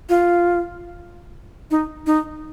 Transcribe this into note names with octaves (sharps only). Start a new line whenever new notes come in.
F4
D#4
D#4